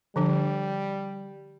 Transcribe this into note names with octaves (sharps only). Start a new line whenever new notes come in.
D3 F3 G3 D4